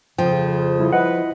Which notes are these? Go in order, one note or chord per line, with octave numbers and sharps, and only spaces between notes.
F2 C#3 F3 G5
G3 E4
E4 B4 D#5 F#5